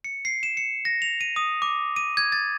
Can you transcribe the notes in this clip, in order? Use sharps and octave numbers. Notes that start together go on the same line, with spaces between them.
C#7
C7
E7
C#7
A#6
F7
D#7
D#6
D6
D#7
G#6
A6